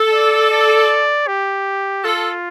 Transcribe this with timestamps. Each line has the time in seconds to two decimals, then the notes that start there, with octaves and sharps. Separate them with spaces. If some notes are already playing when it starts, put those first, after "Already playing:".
Already playing: A4
0.13 D5
0.51 D5
1.27 G4
2.04 F4 A4